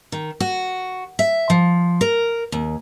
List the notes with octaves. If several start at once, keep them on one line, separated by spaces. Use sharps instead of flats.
D#3
F#4
E5
F3
A#4
D#2